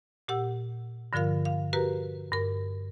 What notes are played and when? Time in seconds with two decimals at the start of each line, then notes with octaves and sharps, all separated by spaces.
0.28 A#2 G4 F#5 E6
1.13 G2 D3 F3 F4 A#4 F5
1.45 F5
1.73 F#4 G4 A#4 B4 A#5
2.32 G2 A#4